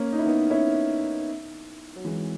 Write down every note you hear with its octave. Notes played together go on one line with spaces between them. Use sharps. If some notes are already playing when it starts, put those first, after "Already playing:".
Already playing: A#3 C#4
D#4
E4
B3 D#4
C#4 E4
F#3
E3 G#3